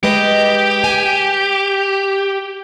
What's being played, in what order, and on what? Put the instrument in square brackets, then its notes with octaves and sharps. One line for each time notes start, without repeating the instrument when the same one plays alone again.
[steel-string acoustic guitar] G#3 B4 D#5 [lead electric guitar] G4
[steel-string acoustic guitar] G#5